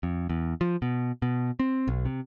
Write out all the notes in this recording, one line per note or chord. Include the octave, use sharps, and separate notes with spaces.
F2
E2
F3
B2
B2
C4
B1
C3